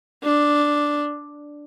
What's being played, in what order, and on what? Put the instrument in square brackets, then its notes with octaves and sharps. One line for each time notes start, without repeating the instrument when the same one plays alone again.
[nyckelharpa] D4